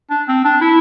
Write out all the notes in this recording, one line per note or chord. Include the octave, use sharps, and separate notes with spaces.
D4
C4
D4
E4